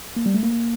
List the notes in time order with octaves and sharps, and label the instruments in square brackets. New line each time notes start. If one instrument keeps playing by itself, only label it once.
[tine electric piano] A#3
G3
A3
A#3